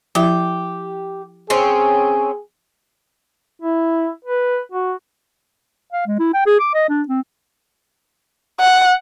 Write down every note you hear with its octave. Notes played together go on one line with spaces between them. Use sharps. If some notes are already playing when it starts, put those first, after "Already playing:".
F3 E4 G4 E5
C4 C#4 G#4
E4
B4
F#4
F5
G#3
E4
G5
G#4
D6
D#5
D4
C4
F#5